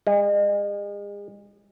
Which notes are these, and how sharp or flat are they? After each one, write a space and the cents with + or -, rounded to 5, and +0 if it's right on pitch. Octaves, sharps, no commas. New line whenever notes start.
G#3 -40